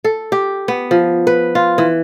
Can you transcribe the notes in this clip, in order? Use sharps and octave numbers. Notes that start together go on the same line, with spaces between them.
A4
G4
B3
F3
B4
F4
E3